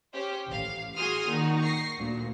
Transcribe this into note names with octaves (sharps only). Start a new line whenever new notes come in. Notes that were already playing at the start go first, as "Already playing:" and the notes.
C#4 G4 C5
A1 F5
F#4 G#4 G#5 C6 D#6 F6
A#2 D#3 D#4 F#4
C#6 A#6 C7
D2 A#2